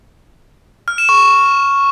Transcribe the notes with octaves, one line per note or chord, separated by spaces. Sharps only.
F6
E7
C#6